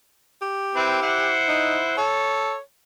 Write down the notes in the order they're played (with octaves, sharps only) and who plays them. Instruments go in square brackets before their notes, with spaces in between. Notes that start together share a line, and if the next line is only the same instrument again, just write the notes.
[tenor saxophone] G4
[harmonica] C4 E4 B4
E4 C5 F#5
[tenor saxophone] D#4
[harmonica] A4 [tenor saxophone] C#5